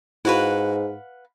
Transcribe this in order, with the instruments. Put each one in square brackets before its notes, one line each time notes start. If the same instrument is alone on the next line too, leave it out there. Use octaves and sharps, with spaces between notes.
[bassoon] G#2 [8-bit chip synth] E4 F#4 [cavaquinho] B4 F5 F#5